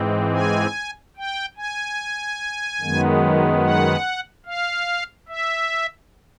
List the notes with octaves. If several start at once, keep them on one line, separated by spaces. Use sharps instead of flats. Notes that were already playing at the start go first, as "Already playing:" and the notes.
Already playing: G#2 E3 G#3 C4
G#5
G5
G#5
F#2 D#3 G#3 B3
F#5
F5
E5